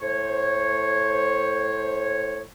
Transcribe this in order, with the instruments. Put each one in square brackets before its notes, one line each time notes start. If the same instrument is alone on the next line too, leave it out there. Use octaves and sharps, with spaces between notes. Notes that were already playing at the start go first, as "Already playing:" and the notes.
[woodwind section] A2 C5 C#5